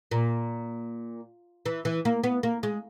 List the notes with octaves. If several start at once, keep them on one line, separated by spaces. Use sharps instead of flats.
A#2
E3
E3
A#3
B3
A#3
G#3